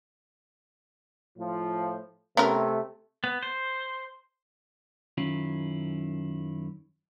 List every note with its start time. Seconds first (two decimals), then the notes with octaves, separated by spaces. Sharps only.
1.38 A2 F3
2.37 C3 A3 B3 C#4 A#4
3.24 B3
3.43 C5
5.18 F#2 D#3 C#4 E4 F4